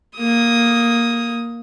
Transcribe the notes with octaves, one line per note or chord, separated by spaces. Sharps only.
A#3 D#6